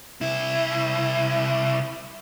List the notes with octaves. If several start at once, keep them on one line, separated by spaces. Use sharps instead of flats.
C2 E4